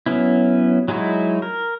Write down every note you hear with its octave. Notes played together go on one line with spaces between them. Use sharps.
F#3 B3 C#4 E4
F#3 G#3 D#4 E4 F#4
A#4